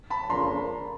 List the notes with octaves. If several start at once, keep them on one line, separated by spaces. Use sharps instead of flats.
A5 B5
F2 C#3 F3 A#3 D4 A#5 C6